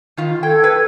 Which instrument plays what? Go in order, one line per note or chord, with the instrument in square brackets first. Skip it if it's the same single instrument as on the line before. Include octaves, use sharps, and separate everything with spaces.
[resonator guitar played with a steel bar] D#3 F4
[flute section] A4 G#6 [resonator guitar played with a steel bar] G5
[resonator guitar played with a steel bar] B4